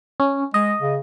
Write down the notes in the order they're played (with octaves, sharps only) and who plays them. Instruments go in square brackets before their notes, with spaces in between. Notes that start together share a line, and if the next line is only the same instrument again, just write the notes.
[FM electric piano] C#4
[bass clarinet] G#3 [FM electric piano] D#5
[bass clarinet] C#3